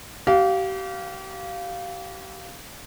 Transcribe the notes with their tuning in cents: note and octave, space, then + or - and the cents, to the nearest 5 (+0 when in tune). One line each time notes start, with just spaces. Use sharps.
G4 -35 F5 +0